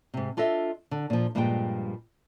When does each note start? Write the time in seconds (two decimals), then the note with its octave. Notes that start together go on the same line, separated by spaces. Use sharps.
0.14 G#2 C3
0.37 D4 F4 A4 D#5 E5
0.91 D3
1.10 A#2 F3
1.35 G2 A#2 F3 G3 G#3 G5